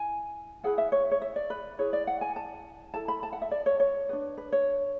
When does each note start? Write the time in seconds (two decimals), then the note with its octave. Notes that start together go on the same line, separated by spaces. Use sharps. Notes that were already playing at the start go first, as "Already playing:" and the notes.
Already playing: E4 G#5
0.64 E4 G#4 B4 F#5
0.78 E5
0.92 C#5
1.11 C#5
1.22 E5
1.36 D5
1.50 B4
1.79 E4 G#4 B4 C#5
1.93 D5
2.07 F#5
2.21 G#5
2.36 A5
2.94 E4 A4 A5
3.08 B5
3.23 A5
3.33 F#5
3.42 E5
3.51 D5
3.66 C#5
3.80 C#5
4.09 D4 F#4 B4
4.37 B4
4.52 C#5